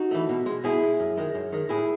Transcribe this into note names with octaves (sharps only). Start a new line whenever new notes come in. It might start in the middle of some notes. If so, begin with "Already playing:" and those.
Already playing: D#4 F#4
E3 A3
B2
G#3
B2 E4 G#4
G#3
F#2
D#3 G#3
F#2
D#3 G#3
A2 E4 G#4